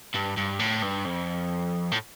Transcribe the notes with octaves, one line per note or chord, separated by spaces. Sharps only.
G2
G2
A2
G2
F2
A2